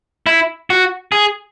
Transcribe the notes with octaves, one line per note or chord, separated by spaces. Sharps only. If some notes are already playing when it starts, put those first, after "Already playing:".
E4
F#4
G#4